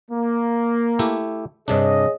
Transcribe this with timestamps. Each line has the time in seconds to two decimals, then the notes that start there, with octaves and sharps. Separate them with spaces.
0.10 A#3
0.99 A3 E4 G4
1.68 G2 C3 D4 G#4 C#5 D#5